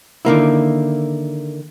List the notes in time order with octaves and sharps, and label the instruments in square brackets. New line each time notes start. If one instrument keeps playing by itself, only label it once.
[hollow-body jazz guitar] D3 D#3 A#3 E4